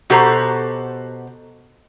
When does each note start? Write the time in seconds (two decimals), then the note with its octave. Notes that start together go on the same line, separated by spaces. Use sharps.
0.10 B2 F#4 G4 A4 C5 A#5